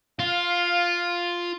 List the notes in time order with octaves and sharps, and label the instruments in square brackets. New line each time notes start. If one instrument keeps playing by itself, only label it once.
[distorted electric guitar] F4 [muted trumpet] F5